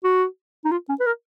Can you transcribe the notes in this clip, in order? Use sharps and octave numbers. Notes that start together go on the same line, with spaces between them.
F#4
D#4
F4
C#4
B4
A#4